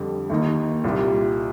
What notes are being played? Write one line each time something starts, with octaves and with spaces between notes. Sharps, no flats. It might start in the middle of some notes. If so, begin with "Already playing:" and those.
Already playing: F2 D3 G3
D#2 D#3 A#3 D#4
C2 A#2 G3 A#3 F4